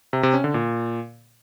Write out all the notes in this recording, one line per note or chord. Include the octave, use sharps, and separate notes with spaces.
C3
C3
C#4
D3
A#2